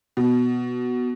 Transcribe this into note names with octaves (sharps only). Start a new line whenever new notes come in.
B2